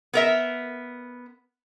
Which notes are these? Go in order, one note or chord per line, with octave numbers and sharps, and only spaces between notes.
B3 A#4 E5